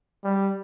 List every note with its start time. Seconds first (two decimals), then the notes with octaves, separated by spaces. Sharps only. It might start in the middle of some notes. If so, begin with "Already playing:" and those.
0.24 G3